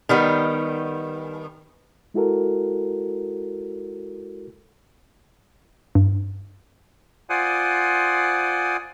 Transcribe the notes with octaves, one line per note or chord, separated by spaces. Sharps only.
D#3 G3 B3
G#3 E4 F#4 A4 A#4
G2
F4 C5 D5 F#5 G#5 D#6